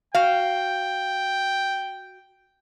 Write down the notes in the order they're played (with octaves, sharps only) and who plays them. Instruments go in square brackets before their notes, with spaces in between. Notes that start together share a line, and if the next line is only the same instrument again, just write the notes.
[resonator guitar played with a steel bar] F#4 F5 [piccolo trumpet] G5